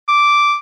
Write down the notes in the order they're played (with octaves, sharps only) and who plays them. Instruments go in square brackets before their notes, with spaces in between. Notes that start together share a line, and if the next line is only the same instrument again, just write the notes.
[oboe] D6